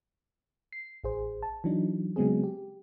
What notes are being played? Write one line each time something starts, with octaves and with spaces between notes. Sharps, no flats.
C7
A1 G#4 C5
A5
E3 F#3 D4 D#4
C#3 F#3 G#3 B3 C4 G#4
G4